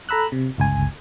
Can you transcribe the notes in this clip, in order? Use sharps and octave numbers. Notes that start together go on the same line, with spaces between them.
A4 A#5 B5 E6 F#6
C3
G1 C#2 G#5